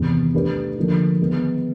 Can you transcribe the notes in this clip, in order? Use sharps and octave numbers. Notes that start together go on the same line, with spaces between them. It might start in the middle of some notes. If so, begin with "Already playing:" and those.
Already playing: E2 C3 D#3
A3 D4 G4 B4 D5
D3 F3 A#3 D#4
D#3 G#3 B3